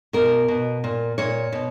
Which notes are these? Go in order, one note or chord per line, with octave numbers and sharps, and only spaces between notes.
B2 A#4
B2
A#2
A#2 C#5
B2